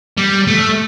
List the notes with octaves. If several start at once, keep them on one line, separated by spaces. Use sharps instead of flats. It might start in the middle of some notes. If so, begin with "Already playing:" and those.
G3
A3